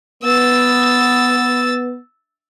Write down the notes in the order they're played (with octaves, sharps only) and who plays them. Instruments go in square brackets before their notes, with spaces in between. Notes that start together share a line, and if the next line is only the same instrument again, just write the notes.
[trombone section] B3 [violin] E6 A6